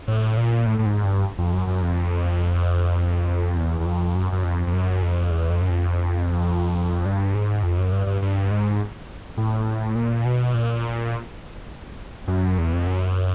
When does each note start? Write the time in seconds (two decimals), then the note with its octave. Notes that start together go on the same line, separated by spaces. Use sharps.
0.08 A2
0.37 A#2
0.66 A2
0.79 A2
0.86 G#2
1.04 G2
1.38 F2
1.53 F#2
1.67 F#2
1.82 F2
3.57 E2
3.80 E2
3.85 F2
4.15 F#2
4.32 F#2
4.44 F2
4.67 F2
4.73 F#2
5.02 F2
5.31 E2
5.50 F2
5.61 F#2
5.70 F2
7.05 G2
7.35 G#2
7.63 F2
7.78 F#2
7.92 G2
8.07 G2
8.22 G2
8.51 G#2
9.37 A2
9.95 A#2
10.25 B2
10.54 A#2
12.28 F#2
12.58 E2
12.73 F2
12.87 F#2